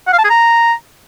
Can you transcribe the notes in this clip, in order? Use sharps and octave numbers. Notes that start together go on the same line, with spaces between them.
F#5
F5
A5
G#4
A#5